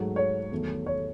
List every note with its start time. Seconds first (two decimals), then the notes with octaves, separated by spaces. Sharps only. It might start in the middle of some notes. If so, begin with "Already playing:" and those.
Already playing: G#2 F#3 A3
0.16 C#5
0.51 E2 D#3 F#3 A3
0.86 C#5